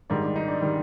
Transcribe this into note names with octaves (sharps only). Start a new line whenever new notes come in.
G#2 D#3 G3 D4
D4
D#4
D4
D#3 G3